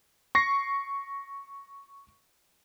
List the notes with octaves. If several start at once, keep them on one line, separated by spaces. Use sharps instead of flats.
C#6 A#6 C7